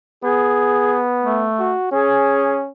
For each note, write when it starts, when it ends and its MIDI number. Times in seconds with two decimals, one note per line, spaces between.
0.24 1.50 59
0.24 1.00 68
1.22 1.74 57
1.60 1.88 66
1.92 2.70 61
1.92 2.60 68